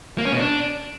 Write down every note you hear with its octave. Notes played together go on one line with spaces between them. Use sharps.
A#3
C#4
B2
D4